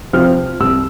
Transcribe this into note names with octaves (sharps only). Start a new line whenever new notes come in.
C3 F3 C4 F6
C2 E6